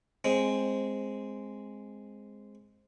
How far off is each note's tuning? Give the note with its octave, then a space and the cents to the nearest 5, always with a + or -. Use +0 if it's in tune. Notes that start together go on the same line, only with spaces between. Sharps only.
G#3 +0 C4 +10